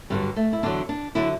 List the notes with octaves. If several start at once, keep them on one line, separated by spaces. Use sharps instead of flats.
G2 D3 F#3 G3
A3
E4
E2 D3 F#3 D4
D4
D3 F#3 E4